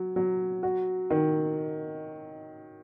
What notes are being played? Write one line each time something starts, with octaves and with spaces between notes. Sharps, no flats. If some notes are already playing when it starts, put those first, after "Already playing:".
Already playing: F#3
F#3
F#4
D#3